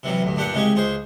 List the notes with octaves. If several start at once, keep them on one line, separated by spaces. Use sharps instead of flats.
C3 E3 F#3 G3
D2 G2
G2 A#2 D4 G4 F#5
C2 C#3 G#3 G4 G#5
C#2 G#4 C5